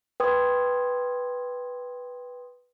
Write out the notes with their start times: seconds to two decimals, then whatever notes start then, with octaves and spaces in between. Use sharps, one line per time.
0.20 B4 G5 C6 D#6 G#6